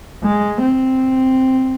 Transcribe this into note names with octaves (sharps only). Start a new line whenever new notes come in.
G#3
C4